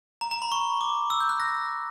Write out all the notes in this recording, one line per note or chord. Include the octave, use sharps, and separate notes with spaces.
A#5
A#5
B5
C#6
D6
E6
G6
F#6
A#6